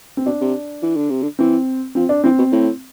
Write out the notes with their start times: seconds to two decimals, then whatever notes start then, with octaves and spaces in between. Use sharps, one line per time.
0.17 C4
0.25 B2 D4
0.41 C3
0.82 E3
0.96 D3
1.10 C3
1.22 D3
1.39 E3 C4
1.95 F3 C4
2.09 D4
2.24 E3 C4
2.38 B2
2.52 A2